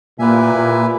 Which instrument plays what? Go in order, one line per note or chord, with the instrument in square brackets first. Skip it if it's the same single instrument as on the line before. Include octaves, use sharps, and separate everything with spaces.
[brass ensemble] A#2 [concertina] E4 G4 B4 E5 G#5
[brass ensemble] A#2